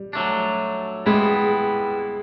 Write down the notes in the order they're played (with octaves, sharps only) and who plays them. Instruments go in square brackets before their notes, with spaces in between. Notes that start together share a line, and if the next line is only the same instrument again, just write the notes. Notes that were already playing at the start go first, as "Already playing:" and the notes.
Already playing: [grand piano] G3
[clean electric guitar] F#3 A3 D4
[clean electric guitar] G3 B3 E4 [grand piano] G#3